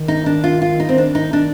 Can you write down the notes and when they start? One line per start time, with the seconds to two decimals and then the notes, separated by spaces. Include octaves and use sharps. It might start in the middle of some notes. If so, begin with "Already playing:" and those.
Already playing: D#3
0.08 D#4
0.26 D4
0.44 F4
0.62 F4
0.80 D#4
0.89 C4
0.98 D4
1.15 D#4
1.33 D4